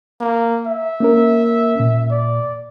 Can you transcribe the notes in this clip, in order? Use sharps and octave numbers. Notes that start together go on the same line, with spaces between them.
A#3
E5
A#3 C#4 A#4
A#2
D5